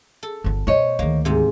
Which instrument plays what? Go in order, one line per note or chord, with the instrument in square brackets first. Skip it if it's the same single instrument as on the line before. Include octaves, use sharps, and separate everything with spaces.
[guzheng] A4
[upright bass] G1 B3
[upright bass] B2 [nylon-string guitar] C5 C#5 D#5
[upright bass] D2 D#3 [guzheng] A#3
[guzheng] G#2 C3